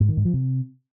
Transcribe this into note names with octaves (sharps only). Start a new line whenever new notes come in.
G#2
D#3
G#2
F3
C3